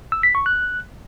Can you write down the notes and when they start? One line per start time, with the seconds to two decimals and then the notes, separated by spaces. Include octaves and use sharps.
0.12 E6
0.23 B6
0.35 C#6
0.46 F#6